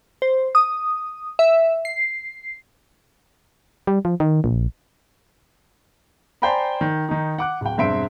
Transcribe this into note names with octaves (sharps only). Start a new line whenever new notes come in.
C5
D#6
E5
C7
G3
F3
D#3
A#1
C5 D5 G5 G#5 A#5 B5
D#3
D#3 D#4
F#5 D6 F#6
D1 G5
E1 G2 C4 E5 C6 D7